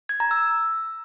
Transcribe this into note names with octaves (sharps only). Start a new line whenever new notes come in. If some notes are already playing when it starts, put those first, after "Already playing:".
G#6
A#5
E6